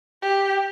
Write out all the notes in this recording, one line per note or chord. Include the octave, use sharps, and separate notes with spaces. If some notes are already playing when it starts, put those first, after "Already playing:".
G4